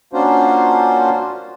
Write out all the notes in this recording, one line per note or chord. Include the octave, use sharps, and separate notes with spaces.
A#3 C#4 D4 F4 F#4 C5